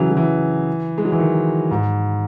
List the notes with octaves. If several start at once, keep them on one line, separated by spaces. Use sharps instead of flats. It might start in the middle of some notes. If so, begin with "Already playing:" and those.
Already playing: C#3 E3 F#3
F#3
E3
G#3
F#3
E3
D#3
G#2